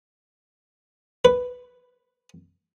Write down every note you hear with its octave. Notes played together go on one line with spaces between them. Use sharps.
B4